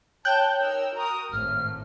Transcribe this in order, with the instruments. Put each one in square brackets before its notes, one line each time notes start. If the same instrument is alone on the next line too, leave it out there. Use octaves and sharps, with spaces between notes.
[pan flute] C#5 [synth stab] G5 F#6 G6 [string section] A5
[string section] D#4 A#4 E6
[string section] F#4 A#4 D#6 [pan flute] A#5
[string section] G#1 A2 [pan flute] F6